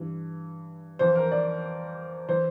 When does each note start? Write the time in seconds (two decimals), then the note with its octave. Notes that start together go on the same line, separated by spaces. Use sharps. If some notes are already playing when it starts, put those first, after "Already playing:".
Already playing: G2 E3
0.99 F2 E3 C5
1.16 A#4
1.32 D5
2.29 E3 C5